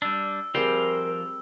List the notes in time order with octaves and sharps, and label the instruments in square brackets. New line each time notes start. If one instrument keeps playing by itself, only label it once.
[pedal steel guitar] G3 D4 [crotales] E6
[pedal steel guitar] F3 F5 G5 [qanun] G3 C4 G#4 [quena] A#4